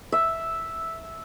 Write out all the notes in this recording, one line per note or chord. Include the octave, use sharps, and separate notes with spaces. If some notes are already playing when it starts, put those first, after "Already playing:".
E5